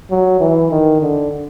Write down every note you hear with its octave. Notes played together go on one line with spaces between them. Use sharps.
F#3
E3
D#3
D3